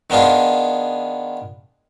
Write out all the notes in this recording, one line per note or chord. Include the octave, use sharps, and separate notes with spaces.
D#3 B3 D4 F4 G#4